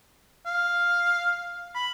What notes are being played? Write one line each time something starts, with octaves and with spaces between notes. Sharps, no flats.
F5
B5